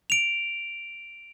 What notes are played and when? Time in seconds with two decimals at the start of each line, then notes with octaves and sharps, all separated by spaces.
0.10 D7 F7